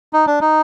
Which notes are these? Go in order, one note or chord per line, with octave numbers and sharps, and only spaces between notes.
D#4
D4
D#4